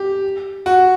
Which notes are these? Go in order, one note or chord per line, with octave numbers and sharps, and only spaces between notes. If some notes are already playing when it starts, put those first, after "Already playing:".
Already playing: G4
F#4